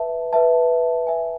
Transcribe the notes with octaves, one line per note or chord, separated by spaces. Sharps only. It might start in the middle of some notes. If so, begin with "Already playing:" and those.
Already playing: B4 E5 A5
B4 E5 A5
B4 E5 G#5